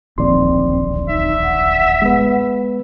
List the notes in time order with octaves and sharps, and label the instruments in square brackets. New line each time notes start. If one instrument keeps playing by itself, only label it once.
[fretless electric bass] D1 A#1 D#2 [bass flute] C4 [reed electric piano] D5 C6
[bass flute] D#4 [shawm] E5
[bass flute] F#5
[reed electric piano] G#3 B3 B4